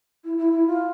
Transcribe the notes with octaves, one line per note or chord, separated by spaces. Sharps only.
E4
E4
E4
F4